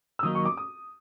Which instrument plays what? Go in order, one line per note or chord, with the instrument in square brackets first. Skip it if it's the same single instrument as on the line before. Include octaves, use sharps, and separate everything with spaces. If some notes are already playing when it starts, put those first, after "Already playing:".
[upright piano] E6
[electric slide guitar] D#3 F#3 A#3 D#4 [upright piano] D#6
[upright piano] C#6
D6
D#6